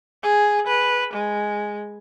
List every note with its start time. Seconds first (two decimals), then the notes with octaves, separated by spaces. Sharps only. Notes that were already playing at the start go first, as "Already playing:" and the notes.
0.23 G#4
0.67 B4
1.13 G#3